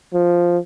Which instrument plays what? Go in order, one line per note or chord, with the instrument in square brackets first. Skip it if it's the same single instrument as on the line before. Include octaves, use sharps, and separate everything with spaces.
[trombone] F3